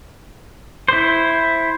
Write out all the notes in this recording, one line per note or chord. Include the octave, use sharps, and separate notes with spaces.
E4 C5